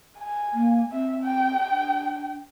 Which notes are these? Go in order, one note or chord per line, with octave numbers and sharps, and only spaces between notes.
G#5
A#3
C4 E5
G5
D4